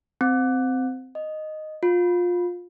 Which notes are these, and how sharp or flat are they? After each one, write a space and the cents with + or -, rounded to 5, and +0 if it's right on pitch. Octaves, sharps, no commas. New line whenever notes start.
C4 -15
D#5 -5
F4 +20